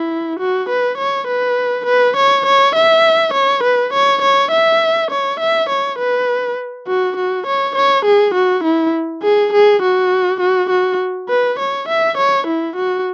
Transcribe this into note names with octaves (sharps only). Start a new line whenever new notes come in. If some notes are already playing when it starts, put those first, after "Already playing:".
Already playing: E4
F#4
B4
C#5
B4
B4
C#5
C#5
E5
C#5
B4
C#5
C#5
E5
C#5
E5
C#5
B4
F#4
F#4
C#5
C#5
G#4
F#4
E4
G#4
G#4
F#4
F#4
F#4
B4
C#5
E5
C#5
E4
F#4